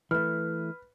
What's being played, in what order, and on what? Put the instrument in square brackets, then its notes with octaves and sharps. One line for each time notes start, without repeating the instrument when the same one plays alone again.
[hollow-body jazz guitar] E3 A3 [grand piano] B4 [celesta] F6